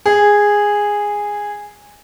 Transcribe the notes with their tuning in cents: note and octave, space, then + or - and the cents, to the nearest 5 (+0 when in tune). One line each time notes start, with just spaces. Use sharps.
G#4 -10